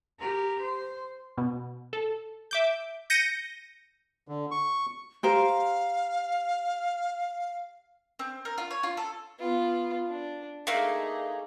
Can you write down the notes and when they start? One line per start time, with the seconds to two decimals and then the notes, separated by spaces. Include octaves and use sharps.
0.19 G4 A#4
0.61 C5
1.38 B2
1.93 A4
2.51 E5 D6 G6
3.10 G6 A#6 C#7 D#7
4.28 D3
4.51 C#6
5.23 G4 A#4 C5 F5
8.19 C4
8.45 A#4
8.58 F4
8.71 C#5
8.83 F4
8.97 A4
9.39 B3 F4
10.07 D4
10.67 A3 A#3 D#4 G#4